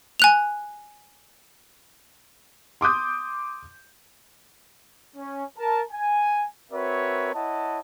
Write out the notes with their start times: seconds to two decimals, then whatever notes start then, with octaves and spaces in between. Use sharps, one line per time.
0.20 G#5 F#6 F7
2.81 C6 D6 D#6 G6
5.16 C#4
5.58 A#4 A5
5.91 G#5
6.71 C4 F#4 A#4 B4 C#5 E5
7.34 E4 C#5 D#5 F#5 A5